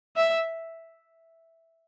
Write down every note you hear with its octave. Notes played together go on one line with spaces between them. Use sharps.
E5